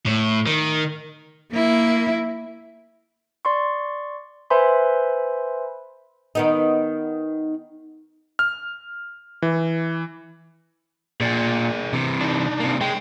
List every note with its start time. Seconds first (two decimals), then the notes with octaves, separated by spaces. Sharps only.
0.07 A2
0.46 D#3
1.52 A#3 E4
3.45 D5 C6 C#6
4.50 B4 C5 E5 G#5 B5 C6
6.35 D#3 B3 D#4
8.39 F6
9.42 E3
11.20 A#2 G#4 A#4 D5
11.93 C3 E3
12.21 D4 D#4
12.60 C3 A#3
12.81 G#3 C#5 G5